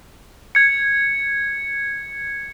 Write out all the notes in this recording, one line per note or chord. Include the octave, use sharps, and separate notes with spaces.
G#6 C#7